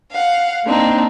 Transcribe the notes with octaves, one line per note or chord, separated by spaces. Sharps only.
F5 F#5
A#3 C4 D4 D#4